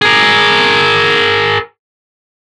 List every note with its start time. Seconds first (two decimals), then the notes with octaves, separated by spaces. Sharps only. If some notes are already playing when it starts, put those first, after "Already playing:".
0.02 G#4 A#4